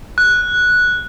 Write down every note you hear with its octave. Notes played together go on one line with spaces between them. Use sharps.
F#6